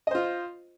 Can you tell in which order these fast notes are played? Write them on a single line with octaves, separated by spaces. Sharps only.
D#5 C5 F4